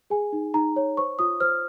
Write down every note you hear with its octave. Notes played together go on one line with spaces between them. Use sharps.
G#4 G#5
D#4
D#4 A#5
C#5
C5 C#6
F4 D#6
C5 F6